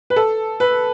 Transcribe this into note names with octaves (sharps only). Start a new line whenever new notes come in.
B4
A4
B4